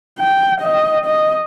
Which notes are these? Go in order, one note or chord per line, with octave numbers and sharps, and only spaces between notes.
G5
D#5
D#5